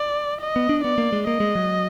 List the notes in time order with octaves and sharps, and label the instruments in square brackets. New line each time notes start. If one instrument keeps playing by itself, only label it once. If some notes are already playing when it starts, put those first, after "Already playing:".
Already playing: [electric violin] D5
D#5
[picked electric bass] B3
D4
[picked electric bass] B3 [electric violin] D5
[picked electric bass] A#3
G#3
[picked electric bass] A#3 [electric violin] D#5
[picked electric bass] G#3
F#3